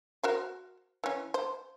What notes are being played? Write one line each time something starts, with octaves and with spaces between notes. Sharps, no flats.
F#4 A#4 C5
E3 C#4
C5